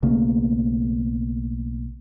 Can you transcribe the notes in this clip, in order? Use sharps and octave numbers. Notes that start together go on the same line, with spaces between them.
B1 C#3 A3 A#3